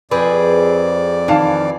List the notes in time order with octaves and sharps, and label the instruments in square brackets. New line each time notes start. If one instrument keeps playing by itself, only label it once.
[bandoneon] F2 D5 [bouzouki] C4 G#4 B4
[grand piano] D#3 F5 A5 [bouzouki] E3